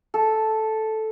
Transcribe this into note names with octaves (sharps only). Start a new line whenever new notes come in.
A4